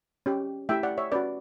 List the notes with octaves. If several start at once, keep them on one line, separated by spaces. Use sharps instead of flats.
C#4 G4
A3 E4 G4 E5 G5
D5 F#5
C#5 E5
C#4 F#4 B4 D5